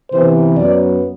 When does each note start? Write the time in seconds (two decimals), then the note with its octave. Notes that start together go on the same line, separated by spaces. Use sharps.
0.11 C3 E3 B3 C5
0.57 F#2 F#3 B3 D5